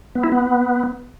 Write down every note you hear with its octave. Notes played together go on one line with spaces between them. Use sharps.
B3
E4
B3